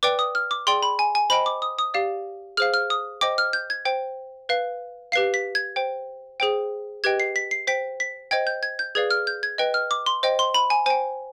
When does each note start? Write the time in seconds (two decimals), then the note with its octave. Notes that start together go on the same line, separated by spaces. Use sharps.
0.03 B4 D5 G5 D6
0.19 D#6
0.35 F6
0.51 D6
0.67 G#4 D5 G5 C6
0.83 B5
0.99 G#5
1.15 G#5
1.30 C5 D#5 G5 B5
1.46 D6
1.62 D#6
1.79 D#6
1.94 G4 D5 F5
2.57 G#4 C5 F5 F6
2.74 F6
2.90 D#6
3.21 C5 D#5 G5 D6
3.38 F6
3.53 G6
3.70 G#6
3.85 C5 G5
4.49 B4 F5
5.12 G4 B4 F5 C7
5.34 B6
5.55 G#6
5.76 C5 G5
6.40 G#4 C5 G5
7.04 G4 B4 D#5 G5 G#6
7.20 C7
7.36 B6
7.51 C7
7.67 C5 G5 B6
8.00 B6
8.31 C5 D#5 G5 G#6
8.47 G6
8.63 G#6
8.79 G6
8.95 G#4 B4 D5 F5 G#6
9.11 F6
9.27 G6
9.43 G#6
9.58 B4 D#5 G5
9.74 F6
9.91 D6
10.06 C6
10.23 C5 D#5 G5
10.39 C6
10.54 B5
10.70 G#5
10.86 C5 G5 G#5